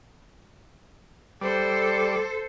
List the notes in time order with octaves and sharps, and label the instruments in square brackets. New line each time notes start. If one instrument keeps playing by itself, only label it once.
[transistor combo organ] G3 D5 [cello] A4 C5